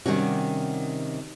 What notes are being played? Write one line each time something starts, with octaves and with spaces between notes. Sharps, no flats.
C3 D#3 G3 C#4 F#4